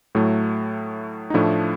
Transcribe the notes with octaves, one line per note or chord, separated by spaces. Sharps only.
A2 F#3 A3
D#4
A2 F3 A3 D4 E4